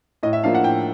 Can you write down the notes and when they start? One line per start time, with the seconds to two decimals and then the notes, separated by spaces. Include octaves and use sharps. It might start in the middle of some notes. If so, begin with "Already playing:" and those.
0.23 A2 D#5
0.33 E5
0.44 F3 A#3 D4 F5
0.55 F#5
0.64 A2 G5